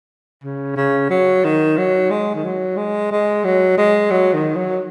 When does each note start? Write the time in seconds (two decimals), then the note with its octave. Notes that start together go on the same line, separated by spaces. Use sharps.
0.44 C#3
0.76 C#3
1.10 F#3
1.44 D#3
1.78 F#3
2.11 G#3
2.35 D#3
2.44 F#3
2.77 G#3
3.11 G#3
3.44 F#3
3.77 G#3
4.11 F#3
4.34 D#3
4.55 F#3